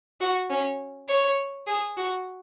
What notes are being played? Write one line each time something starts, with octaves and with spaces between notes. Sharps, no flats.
F#4
C#4
C#5
G#4
F#4